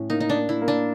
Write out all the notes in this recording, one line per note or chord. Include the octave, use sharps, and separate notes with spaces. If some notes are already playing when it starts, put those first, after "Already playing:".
Already playing: A2 C#4
A#3 D#4
D#4
D4
A#3
E4
A#3
D4